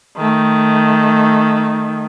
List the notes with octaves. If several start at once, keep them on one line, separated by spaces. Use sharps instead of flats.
D#3 A3